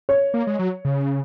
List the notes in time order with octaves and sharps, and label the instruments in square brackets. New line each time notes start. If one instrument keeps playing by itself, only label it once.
[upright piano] C#5
[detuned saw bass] A#3
G#3
F#3
C#3